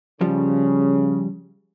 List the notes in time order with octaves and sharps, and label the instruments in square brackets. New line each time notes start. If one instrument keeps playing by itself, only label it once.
[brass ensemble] C#3 [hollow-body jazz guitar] F3 G3